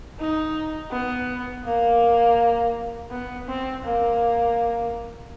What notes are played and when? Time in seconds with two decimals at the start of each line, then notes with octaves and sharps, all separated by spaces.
0.19 D#4
0.91 B3
1.65 A#3
3.11 B3
3.48 C4
3.84 A#3